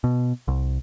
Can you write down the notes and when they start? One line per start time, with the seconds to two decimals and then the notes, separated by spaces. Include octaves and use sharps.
0.04 B2
0.48 C2